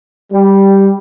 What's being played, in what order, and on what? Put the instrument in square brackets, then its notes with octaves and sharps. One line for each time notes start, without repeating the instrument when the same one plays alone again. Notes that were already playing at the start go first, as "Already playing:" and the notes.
[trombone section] G3